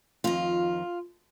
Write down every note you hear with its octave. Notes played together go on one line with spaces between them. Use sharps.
F2 D#3 F4